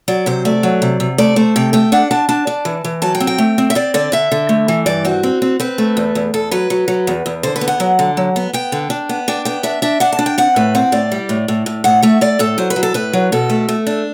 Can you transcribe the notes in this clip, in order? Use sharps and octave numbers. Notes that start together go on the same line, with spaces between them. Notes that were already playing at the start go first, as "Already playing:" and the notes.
F#3 D5
C3 C5
A3 D5
F#3
C3
C3
A3 D5
A3 C5
C3 G5
A3 G5
D4 F#5
D4 A5
D4 A5
D4
E3
E3
F#3 A5
G5
C4
G5
A3
C4
E5
C4 D5
D3 D5
D3 E5
D3
A3
E3
G2 D5
C4 F#4
C4
C4
C4 B4
A3
E2
E2
E2 A4
F#3 B4
F#3
F#3
E2
E2
D3 C5
B4
B3
F#5
F#3
D3
F#3
B3
B3 G5
D3
D4
B3
D4 G5
B3 G5
D4 E5
D4 E5
D4 F#5
A5
D4
G5
C4 F#5
A2 B4
C4 F#5
A2 D5
G3
A2
A2
A2
A2 F#5
A3 E5
A3 D5
A2 A4
F#3 C5
B4
F#3
A4
A2 B4
F#3
B2 A4
A3
A3
D4